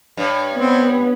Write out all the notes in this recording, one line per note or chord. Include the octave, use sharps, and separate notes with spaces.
G2 C#5
B3 C4